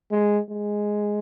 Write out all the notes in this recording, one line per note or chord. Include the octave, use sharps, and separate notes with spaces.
G#3
G#3